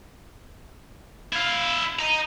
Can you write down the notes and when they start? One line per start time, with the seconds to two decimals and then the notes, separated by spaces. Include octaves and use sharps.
1.32 E4 F5
1.99 D#5 A#5